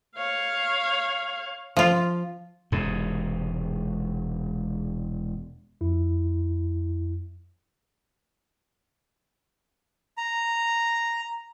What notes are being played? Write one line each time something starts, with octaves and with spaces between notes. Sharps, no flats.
C#5 F5
F3 F4
E1 G#2 C3
F2 E4
A#5